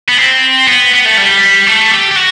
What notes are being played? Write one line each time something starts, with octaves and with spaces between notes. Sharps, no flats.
B3
C4
B3
B3
A3
G3
A3
G4
G4
F#4